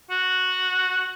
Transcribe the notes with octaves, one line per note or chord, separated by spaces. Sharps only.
F#4